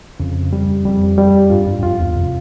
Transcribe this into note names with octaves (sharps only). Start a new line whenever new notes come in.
F2 C#3
G3
F2 G3
G3
G2 F4
G2
G2
F2 F4
E2
F2 C3